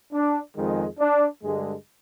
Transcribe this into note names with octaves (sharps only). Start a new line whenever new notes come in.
D4
F2 D#3 G#3
D4
G2 D3 G#3